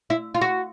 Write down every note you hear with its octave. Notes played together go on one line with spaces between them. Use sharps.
E4
F4
F#4